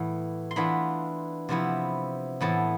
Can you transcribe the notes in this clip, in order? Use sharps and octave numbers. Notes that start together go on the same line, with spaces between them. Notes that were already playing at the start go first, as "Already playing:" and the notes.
Already playing: A2 E3 B3
C6
E3 B3 D4 F4 B5
C3 F3 B3 E4
A2 E3 B3 A5